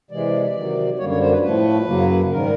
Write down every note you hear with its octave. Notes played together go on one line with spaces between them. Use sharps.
C3 E3 G#3 D5
C3 D#3 F#3
F#2 D3 G3 A#3 C#5
C#5
C5
B4
A2 F3 A3 B4
F#2 C#3 F#3 A#3
G#2 D#3 G3 A#4